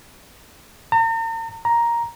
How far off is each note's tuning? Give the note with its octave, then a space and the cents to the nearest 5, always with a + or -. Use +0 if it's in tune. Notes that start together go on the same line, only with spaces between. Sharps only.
A#5 -45
A#5 +5